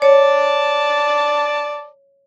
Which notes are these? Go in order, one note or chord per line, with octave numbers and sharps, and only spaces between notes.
C#5 D5 A5